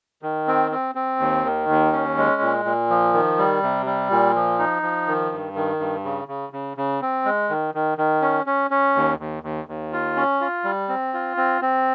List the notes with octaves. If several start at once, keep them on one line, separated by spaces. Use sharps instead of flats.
D#3
C4
C4
C4
D#2
D#3
D#2
C#4
G#3
A#2
A#2
F3
D#3
G3
C3
G3
A#2
F3
D#4
F3
D#3
G2
D#3
G2
C#3
C#3
C#3
C#3
C4
G#3
D#3
D#3
D#3
C#4
C#4
C#4
D#2
D#2
D#2
D#2
F4
C#4
F4
G3
C4
F4
C4
C4